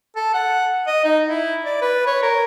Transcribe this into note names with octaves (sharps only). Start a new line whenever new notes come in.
A4
F#5
D#5
D#4
E4
D5
B4
C#5
A#4